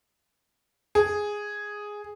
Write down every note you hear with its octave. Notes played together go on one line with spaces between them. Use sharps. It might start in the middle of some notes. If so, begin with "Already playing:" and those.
G#4